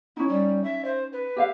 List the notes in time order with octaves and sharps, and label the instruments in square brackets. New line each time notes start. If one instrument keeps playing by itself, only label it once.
[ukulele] C#4 D#4 [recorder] E4
[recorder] G3
E5
C5
B4
[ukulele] G4 E5 F5